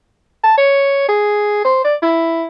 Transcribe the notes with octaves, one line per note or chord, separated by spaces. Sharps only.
A5
C#5
G#4
C5
D5
E4